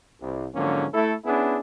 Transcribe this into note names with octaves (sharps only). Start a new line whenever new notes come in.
C2
G#2 D3 F3 F#3 A#3 C#4
A3 E4 A4
B3 C#4 D4 E4 G#4